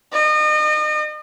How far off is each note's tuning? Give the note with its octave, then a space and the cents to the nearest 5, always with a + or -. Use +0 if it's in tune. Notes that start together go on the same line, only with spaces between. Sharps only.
D#5 -35